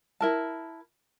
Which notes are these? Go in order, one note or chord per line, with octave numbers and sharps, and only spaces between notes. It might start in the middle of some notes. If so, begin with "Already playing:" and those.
E4 A#4 A5